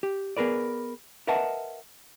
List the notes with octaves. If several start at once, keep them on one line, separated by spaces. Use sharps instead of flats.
G4
B3 G#4 A#4 B4 D5
A#4 B4 D#5 E5 F#5 A5